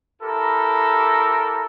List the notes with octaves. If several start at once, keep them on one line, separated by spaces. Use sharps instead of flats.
E4 G4 A4 A#4